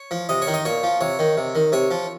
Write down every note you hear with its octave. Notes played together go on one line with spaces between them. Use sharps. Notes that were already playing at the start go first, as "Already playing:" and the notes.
Already playing: C#5
F3
C3 D#5
C#5
D#3
D#5
A#2 C#5
F3
C3 C#5
D#3
C3
D#3
C3 C#5
F3